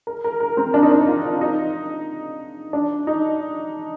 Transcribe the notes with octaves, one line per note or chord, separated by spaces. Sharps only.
A#4
A#4
A#4
C4
D4
D#4
D4
F4
D#4
D4
D#4